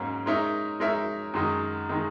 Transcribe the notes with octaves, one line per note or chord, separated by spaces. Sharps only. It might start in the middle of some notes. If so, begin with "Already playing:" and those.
Already playing: G#2 F#3 A#3 C#4
G#3 D#4 A#4 C#5 E5
G#3 D#4 A#4 C#5 E5
F#2 D#3 G#3 D#4
D#3 G#3 D#4